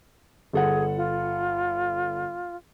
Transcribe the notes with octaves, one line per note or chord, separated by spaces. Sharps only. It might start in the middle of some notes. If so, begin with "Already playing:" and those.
G1 G#4 A4 F#5
F4